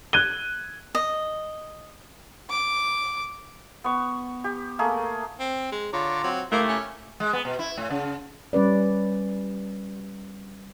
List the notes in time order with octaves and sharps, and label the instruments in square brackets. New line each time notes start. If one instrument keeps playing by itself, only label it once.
[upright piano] F#6 G#6 D#7 G7
[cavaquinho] D#5
[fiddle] D6
[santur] B3 C#6
G4
A3 A#3 G#4 A#4
[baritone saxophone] C4
G#3
[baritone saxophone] D3 [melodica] F4 A#5 D6 [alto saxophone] C#5
[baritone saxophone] F#3 [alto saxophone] C4
[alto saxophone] A3 [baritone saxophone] A#3 [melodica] E4 G4 A#4
[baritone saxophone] C#4
[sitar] G#3
B3
B2
E4
A2
C#3
[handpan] G3 C#4 B4 D5